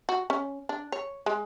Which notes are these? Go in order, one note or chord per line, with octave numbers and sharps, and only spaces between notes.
F#4
C#4
D4
C#5
G#3